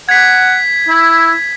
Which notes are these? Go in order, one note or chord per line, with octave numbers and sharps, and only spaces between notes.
F#5 G#6 B6
E4